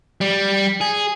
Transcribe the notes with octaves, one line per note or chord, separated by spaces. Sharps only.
G3
G#4